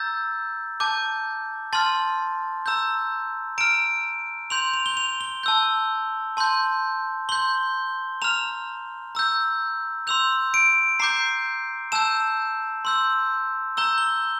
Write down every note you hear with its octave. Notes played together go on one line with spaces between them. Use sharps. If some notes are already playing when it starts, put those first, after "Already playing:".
Already playing: A#5 E6 G6 A6
A5 D6 G6
A5 C6 F6 A6
A#5 E6 G6
A#5 F6 D7
C6 G6 F7
F7
G7
F7
G7
A5 E6 G6
A5 C6 G6
C6 G6 G7
A#5 F6 F7
A#5 E6 G6
C6 E6 G6 F7
D7
A#5 D6 G6 C7
A5 E6 G6 E7
C6 E6 G6
A#5 E6 G6 G7
G7